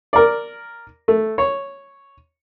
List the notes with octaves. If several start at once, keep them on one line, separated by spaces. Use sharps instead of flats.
A#4 D5
A3
C#5